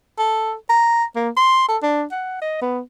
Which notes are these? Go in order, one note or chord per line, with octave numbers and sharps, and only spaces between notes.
A4
A#5
A#3
C6
A4
D4
F#5
D#5
B3